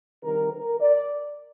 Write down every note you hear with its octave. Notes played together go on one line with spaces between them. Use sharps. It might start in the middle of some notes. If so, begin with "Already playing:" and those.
C3 D#3 G3 A#4
A#4
D5